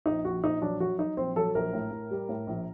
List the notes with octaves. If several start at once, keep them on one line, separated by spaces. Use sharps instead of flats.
A#1 D#4
A#1 F#4
A#1 D#4
F#3 D4
F#3 F#4
F#3 D#4
A#1 C4
F#3 A4
A#1 A#4
A2
A2
G3
A2
A#1